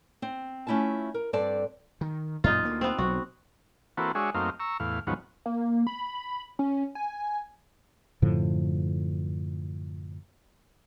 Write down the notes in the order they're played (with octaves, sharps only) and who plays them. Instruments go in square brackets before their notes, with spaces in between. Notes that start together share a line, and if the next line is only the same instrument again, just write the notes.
[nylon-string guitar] C4
A3 C#4 E4 F4 A5
A#4
G2 C4 A4 D5 A5
[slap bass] D#3
[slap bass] F#2 A#2 [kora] D#4 F4
[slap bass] D2 A#3
[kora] B3 C4
[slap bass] B1 F#3 [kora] F#4
[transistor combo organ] E3 A#3 C4 F#4 A4 B4
G#3 D4 F#4 G#4 C#5 E5
F#2 A3 A#3 C4 D#4 F5
A#5 C#6 E6
E2 A2 F5
D#2 G#2 F3 F#3 B3 C#4
[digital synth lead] A#3
B5
C#4
G#5
[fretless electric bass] F#2 A2 D3 F3